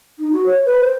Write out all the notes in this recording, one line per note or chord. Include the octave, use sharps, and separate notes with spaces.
D#4
F#4
C#5
B4
C5